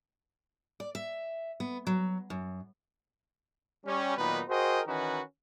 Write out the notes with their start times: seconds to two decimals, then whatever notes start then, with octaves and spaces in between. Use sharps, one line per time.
0.80 D5
0.95 E5
1.60 B3
1.87 F#3
2.30 F#2
3.85 G3 C#4
4.17 A#2 D#3 F#3 B3 D#4 B4
4.49 F#4 G#4 A#4 C5 D#5 G5
4.86 D#3 E3 C#4 D#4 F#4 B4